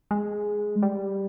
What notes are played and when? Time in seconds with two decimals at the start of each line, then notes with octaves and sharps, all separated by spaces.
0.11 G#3
0.82 G3